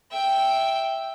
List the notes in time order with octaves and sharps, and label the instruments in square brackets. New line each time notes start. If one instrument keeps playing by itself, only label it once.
[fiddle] E5 G5